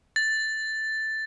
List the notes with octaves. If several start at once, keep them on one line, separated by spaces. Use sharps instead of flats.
A6